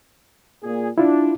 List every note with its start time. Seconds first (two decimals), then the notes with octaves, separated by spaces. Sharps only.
0.63 A#2 G#4
0.98 D4 E4 F4